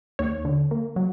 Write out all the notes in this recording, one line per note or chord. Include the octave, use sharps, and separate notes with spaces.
D#2 C#5
D3
A#3
F#3